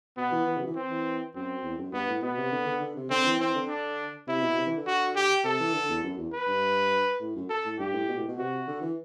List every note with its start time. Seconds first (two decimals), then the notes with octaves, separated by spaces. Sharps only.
0.17 B2 B3
0.32 E3
0.48 E3
0.57 C3
0.62 F#3
0.67 E3
0.76 C4
0.90 E3
1.35 F#2 C4
1.63 E2
1.78 F#2
1.93 G2 B3
2.08 A2
2.22 B2 B3
2.38 C3
2.52 D3
2.66 D3
2.81 D3
2.96 C3
3.10 D3 C4
3.25 E3
3.40 E3 C4
3.55 D3
3.69 D4
4.27 C3 E4
4.42 B2
4.58 C3
4.67 E3
4.77 D3
4.87 F#4
5.15 G4
5.44 C3 A4
5.60 E3
5.74 D3
5.89 E2
6.04 F#2
6.18 E2
6.33 B4
6.47 G2
7.21 A2
7.36 F#2
7.50 A4
7.65 A2
7.79 G2 G4
7.94 A2
8.09 B2
8.18 A2
8.28 B2
8.38 C3 F#4
8.68 D3
8.82 E3